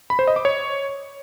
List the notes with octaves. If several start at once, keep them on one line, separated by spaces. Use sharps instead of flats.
B5
C5
D#5
D6
C#5